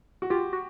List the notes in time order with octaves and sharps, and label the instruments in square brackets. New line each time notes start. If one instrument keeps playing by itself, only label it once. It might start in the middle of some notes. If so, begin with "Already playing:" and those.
[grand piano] F#4
[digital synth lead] F4 [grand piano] G4
[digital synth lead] F#4